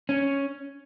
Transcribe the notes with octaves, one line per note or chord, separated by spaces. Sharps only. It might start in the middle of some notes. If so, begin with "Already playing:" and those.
C#4